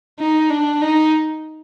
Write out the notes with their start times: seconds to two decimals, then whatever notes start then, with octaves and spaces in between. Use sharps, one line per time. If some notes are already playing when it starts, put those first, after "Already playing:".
0.19 D#4
0.50 D4
0.81 D#4